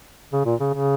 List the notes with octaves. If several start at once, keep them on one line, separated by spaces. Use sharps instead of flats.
C#3
A#2
C#3
C#3